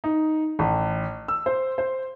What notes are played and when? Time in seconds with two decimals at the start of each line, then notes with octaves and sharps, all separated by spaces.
0.04 D#4
0.59 A1
1.28 E6
1.46 C5
1.78 C5